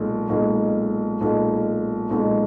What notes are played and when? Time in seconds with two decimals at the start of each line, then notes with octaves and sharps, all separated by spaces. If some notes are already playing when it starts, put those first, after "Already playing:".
Already playing: B1 A#2 G#3
0.29 B1 A#2 G#3
1.21 B1 A#2 G#3
2.10 B1 A#2 G#3